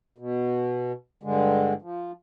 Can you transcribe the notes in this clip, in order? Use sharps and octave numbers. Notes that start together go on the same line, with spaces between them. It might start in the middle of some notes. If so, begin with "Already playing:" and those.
B2
G2 D3 G#3
F3